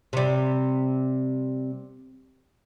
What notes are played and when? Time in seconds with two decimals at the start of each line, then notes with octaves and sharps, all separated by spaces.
0.13 C3 G3